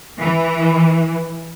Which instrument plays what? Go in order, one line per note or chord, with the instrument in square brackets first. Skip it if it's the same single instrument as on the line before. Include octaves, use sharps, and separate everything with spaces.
[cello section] E3